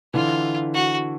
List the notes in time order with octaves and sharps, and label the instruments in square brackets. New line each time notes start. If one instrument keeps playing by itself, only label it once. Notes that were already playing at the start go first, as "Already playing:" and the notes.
[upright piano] D3 E3 [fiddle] F4
[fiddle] F#4